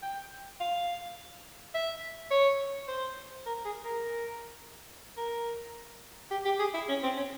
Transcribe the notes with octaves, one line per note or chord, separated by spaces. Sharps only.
G5
F5
E5
C#5
C5
A#4
G#4
A#4
A#4
G4
G4
G#4
E4
C#4
C4
C#4